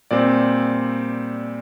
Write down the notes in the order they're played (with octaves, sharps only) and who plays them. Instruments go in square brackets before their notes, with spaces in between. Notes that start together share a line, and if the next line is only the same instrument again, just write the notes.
[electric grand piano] A#2 G3 C4 D5